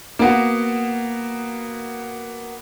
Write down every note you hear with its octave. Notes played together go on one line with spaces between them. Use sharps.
A#3 B3 F#4